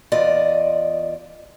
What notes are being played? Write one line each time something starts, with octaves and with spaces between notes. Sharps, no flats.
E2 F4 D5 D#5